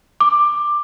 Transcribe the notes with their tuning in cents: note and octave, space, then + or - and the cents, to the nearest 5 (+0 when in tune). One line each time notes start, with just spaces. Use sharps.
D6 +15